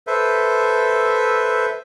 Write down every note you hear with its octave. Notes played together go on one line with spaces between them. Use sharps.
A4 B4 C5 E5